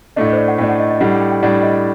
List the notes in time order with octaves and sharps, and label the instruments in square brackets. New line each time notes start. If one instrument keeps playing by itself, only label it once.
[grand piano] A2 A3 D4 [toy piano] D#5
[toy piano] D#5
C5
D5
F#5
[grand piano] A2 [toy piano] G5
[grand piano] A3 D4
[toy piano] F#5
D#5
D#5
[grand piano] A2 G3 D4 [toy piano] F#5
[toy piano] F#5
G5
G5
[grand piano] A2 G3 D4 [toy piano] F#5
[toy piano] D#5